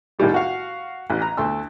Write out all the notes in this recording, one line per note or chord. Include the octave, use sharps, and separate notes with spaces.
C2 A2 D#3 G3 G#3
F#4 F5
A1
A#5
D2 A3 A5 C6 E6